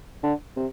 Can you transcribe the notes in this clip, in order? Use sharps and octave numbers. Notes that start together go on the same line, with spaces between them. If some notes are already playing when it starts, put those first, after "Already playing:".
D3
C3